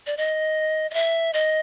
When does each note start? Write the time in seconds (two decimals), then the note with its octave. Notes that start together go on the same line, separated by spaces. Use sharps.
0.06 D5
0.17 D#5
0.91 D#5
0.94 E5
1.33 D#5